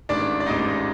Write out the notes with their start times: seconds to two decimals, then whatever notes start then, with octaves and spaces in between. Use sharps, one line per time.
0.09 A1 G#2 D#3 D4 D5
0.40 D5
0.46 A1 G#2 D#3 D#4 D#5